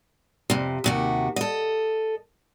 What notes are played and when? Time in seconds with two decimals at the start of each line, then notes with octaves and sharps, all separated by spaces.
0.50 F2 C3
0.84 D#2 C3 F#4
1.36 A4 D#5